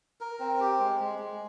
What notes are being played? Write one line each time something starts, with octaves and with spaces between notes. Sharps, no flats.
A#4
C4
G4
G#3
G#3
G#3